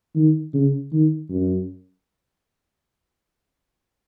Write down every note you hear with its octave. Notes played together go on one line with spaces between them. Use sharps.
D#3
C#3
D#3
F#2